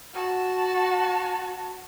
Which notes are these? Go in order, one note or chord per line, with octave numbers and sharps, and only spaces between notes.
F#4 A5